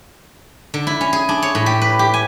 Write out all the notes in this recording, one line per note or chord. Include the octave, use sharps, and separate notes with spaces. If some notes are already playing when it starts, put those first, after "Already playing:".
D3
E4
C#4
G#4
D4
C#5
A2
G4
B4
G4
G#5